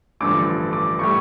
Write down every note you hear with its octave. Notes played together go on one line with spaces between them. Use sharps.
A1 G2 D3 F3 D6
D6
A2 G3 C#6